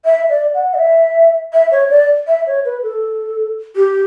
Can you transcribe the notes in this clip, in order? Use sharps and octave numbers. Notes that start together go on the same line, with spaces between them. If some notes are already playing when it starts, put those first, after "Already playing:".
E5
D5
F#5
D5
E5
E5
C#5
D5
E5
C#5
B4
A4
G4